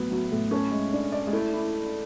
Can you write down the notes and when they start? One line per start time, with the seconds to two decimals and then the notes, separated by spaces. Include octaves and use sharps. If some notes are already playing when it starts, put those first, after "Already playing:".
Already playing: A2 F#3 B3
0.11 F#3
0.32 A2
0.51 C#4 A4
0.72 G#3
0.93 D4
1.12 D5
1.27 G#3
1.33 A3 E4
1.53 E4